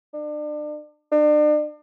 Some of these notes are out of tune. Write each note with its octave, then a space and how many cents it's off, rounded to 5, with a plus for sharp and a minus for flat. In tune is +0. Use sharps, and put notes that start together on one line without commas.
D4 +35
D4 +40